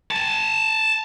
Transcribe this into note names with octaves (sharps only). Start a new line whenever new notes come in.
G#5 A5